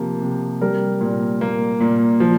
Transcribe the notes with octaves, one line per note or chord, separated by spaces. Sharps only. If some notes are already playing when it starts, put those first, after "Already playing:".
Already playing: C3 F3 A#3
C3
G3 A#4
A#2
A#3
A#2
F3